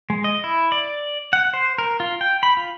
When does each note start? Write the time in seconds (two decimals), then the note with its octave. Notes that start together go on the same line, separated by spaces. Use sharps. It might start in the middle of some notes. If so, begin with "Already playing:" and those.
0.10 G#3
0.24 D#5
0.44 E4
0.72 D5
1.33 F#5
1.54 C5
1.78 A#4
2.00 F4
2.21 G5
2.43 B5
2.57 F4